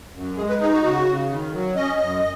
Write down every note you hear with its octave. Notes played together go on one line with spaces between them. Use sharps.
F#2
G#3 G#4
B4
D#4 G#4
F#4
C#3 F#4
C#3
D#3
F#3
C#4 D#5
F#2